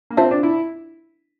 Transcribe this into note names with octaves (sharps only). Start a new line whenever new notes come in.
A#3
C4 F4 C5 E5 A5
D4
E4